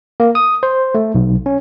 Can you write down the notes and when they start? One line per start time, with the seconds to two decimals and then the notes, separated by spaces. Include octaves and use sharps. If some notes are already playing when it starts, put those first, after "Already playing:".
0.20 A#3
0.35 D#6
0.63 C5
0.95 A3
1.15 B1
1.46 C#4